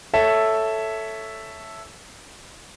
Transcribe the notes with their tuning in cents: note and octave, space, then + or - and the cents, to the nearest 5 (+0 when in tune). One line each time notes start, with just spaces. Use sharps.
A4 +0 C#5 +10 E5 +0